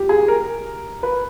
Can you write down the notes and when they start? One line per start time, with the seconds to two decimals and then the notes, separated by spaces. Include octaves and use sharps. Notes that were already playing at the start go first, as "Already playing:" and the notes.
Already playing: G4
0.09 G#4
0.28 A#4
1.03 B4